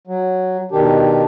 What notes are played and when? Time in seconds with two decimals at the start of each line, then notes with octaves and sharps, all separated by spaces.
0.07 F#3
0.72 B2 D#3 D4 G4